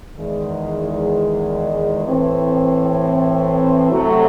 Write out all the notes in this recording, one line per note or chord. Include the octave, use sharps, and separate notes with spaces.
E2 D#3 G#3
A2 E3 C4
C3 F#3 A3